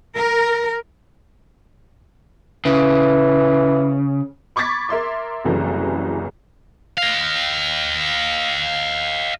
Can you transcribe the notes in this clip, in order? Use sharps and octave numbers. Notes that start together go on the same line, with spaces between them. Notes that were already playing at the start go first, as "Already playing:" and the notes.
A#4
C#3 E3
B5 C#6 D6 G#6 A6 B6
A#4 E5 C6 D6
F#1 C2 C#3 E3 F#4 A4
D#5 F5